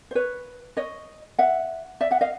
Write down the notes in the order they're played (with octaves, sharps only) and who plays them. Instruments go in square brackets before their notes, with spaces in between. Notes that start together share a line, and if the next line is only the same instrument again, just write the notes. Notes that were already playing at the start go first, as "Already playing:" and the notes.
[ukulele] C5
B4 C#5
C#5 D#5
E5 F#5
D5 E5
E5 F#5
D#5 F5